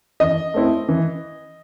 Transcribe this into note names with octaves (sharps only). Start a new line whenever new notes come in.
E3 D#5
A3 C4 E4
E3